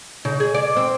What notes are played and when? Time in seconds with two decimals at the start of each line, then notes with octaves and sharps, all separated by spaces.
0.25 C#3
0.40 G#4
0.54 D5
0.76 C4